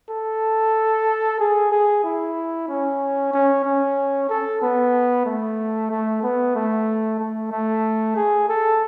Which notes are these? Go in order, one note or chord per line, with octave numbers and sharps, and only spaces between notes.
A4
G#4
G#4
E4
C#4
C#4
C#4
A4
B3
A3
A3
B3
A3
A3
A3
G#4
A4